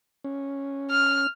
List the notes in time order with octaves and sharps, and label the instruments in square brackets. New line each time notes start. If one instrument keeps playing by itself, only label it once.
[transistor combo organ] C#4
[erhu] F6